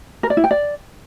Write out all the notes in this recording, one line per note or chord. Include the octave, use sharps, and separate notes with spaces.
A#4
D5
E4
G5
D5